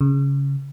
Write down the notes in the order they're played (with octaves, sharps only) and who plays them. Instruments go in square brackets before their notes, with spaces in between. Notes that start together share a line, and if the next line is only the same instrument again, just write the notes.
[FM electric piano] C#3